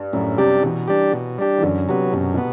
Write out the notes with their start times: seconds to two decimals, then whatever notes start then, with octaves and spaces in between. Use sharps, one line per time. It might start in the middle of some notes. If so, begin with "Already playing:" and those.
Already playing: G2
0.13 F#2 A2
0.38 C3 G3 D4 G4
0.63 B2 E3
0.88 G3 D4 G4
1.14 B2
1.39 G3 D4 G4
1.58 E3
1.63 F#2 D3
1.88 C3 F#3 B3
2.13 F#2 B2
2.34 B2
2.38 B3